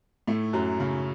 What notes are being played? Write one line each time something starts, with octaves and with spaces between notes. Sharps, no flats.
A2 A3
F#2 F#3
C#3